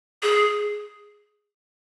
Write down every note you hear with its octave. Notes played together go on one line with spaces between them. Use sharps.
G#4